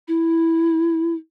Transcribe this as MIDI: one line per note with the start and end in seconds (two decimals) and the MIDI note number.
0.08 1.14 64